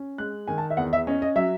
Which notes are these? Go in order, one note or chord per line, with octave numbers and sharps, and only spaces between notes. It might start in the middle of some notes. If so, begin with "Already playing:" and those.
Already playing: C#4
G#3 F#6
D#3 G#5
A5
E5
E2 F#5
E5
C#4 D#5
D#5
F#3 E5